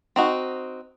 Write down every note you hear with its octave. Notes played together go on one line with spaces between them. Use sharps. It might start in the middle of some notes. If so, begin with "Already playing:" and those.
C4 D#4 F#4